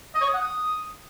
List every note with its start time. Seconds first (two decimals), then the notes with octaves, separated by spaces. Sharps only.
0.15 D#5
0.21 C#5
0.27 D#6
0.34 F#5
0.40 D#6